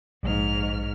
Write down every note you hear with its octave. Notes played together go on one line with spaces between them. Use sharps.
A#1 G#2 F6